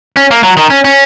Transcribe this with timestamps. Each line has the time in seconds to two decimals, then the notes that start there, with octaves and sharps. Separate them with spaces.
0.16 C#4
0.31 A#3
0.43 F#3
0.57 D#3
0.70 C#4
0.84 C#4